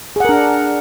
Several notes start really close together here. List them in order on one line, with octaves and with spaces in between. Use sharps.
G#4 F#5 A#4 D4